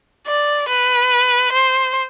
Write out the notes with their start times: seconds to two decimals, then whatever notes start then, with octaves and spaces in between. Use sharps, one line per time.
0.27 D5
0.69 B4
1.52 C5